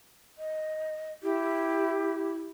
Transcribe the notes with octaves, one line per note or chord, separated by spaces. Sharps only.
D#5
E4 G4